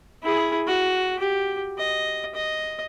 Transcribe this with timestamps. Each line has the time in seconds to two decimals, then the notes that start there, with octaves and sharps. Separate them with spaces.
0.22 E4 G#4
0.67 F#4
1.19 G4
1.78 D#5
2.35 D#5